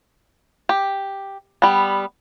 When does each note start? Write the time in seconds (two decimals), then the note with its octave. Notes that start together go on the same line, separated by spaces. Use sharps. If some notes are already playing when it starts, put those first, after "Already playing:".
0.69 G4
1.62 G3 B3